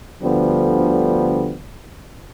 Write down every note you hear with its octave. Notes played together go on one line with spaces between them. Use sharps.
D2 D3 F3 G3 B3